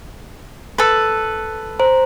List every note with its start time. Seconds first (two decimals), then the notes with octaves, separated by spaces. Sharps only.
0.78 A4 B4
1.79 C5 A#5